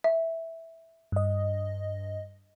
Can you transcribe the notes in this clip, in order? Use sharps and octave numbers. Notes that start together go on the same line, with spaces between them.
E5
G2 D#5